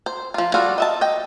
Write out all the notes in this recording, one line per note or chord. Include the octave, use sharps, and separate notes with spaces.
C5
F3 F4
G3 F4 F#4 A4 F5
D#5 E5 A5
D#5 G5